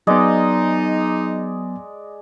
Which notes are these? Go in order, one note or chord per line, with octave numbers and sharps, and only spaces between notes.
F#3 G#3 B3 D#4 D5 D#5